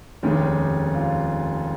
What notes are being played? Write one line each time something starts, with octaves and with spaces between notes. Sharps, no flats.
F1 D#2 D#3 G#3 C#4 G4
F4